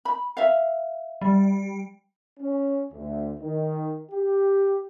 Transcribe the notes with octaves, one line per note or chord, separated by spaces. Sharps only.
B5
E5 F5
G3
C#4
D2
D#3
G4